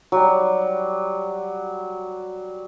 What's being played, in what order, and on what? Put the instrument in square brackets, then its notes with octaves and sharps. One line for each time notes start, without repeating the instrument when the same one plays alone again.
[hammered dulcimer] F#3 G3